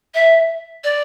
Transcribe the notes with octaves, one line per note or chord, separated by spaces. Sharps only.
E5
D5